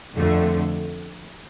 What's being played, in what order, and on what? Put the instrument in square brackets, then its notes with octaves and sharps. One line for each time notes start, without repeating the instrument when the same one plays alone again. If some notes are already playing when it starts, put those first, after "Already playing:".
[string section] F2 D3 A3